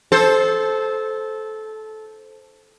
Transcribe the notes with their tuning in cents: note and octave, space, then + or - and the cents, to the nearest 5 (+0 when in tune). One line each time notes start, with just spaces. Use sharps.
A4 -15 C5 +0